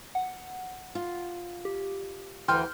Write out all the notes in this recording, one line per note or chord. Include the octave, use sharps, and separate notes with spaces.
F#5
F4
G4
D2 E3 G5 C6 F6 G6